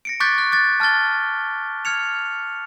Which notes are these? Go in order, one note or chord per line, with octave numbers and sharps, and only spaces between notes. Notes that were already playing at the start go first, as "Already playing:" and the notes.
A#6 C#7 D7
C#6 D6 F#6 G6 A6 B6
F#6
D6 F#6 A6
A5 F6 F#6 A6 G7
F6 G#6 C#7 F7